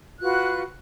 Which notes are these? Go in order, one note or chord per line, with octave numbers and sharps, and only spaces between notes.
F4 F#4 B4 F#6